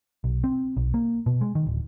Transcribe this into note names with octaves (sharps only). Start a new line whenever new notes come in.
B1
C4
B1
A#3
B2
G#3
D#3
D1